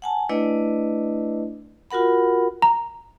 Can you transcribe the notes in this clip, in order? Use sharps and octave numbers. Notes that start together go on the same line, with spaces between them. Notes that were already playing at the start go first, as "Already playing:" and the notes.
F#5 G#5 A5
A3 D4 E4 B4 D5 D#5
F4 F#4 A#4 F#5 B5
A#5